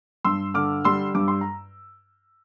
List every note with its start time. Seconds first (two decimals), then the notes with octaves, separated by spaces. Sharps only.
0.24 G2 C6 E6
0.54 D3 D6 F6
0.85 G3 C6 E6
1.15 G2 D6
1.28 C6
1.41 A#5